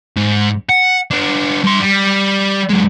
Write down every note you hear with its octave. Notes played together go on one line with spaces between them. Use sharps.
G#2
F#5
B3 D4
G2 C6
G3
F#2 G#3